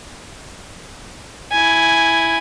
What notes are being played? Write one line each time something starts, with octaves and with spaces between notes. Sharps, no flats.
E4 G#5